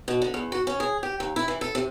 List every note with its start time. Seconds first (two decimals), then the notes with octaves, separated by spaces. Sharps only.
0.08 B2
0.22 D3
0.34 E2
0.52 F#4
0.67 C#4
0.80 G#4
1.03 G4
1.20 D#2
1.36 E4
1.48 E3
1.61 A4
1.75 C3